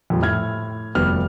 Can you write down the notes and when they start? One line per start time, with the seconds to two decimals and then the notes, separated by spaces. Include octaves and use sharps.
0.10 F2 A#2 G3
0.22 A2 F6 G#6
0.95 F1 D#2 G3 B3 F#4 F6